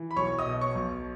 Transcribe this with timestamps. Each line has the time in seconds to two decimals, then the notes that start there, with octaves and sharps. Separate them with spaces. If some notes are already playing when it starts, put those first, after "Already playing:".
Already playing: E3
0.11 B5
0.16 B1 C#5 C#6
0.39 D#5 D#6
0.46 B2
0.61 C#5 C#6
0.75 B1